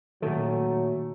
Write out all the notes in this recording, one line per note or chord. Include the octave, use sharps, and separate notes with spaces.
A#2 D#3 F#3 A3